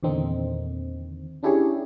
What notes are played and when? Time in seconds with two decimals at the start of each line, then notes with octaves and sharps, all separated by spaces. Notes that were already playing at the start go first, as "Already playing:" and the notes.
0.03 E2 A#2 D3 D#3 C4 D#4
1.43 C#4 D4 E4 G4 G#4 C#5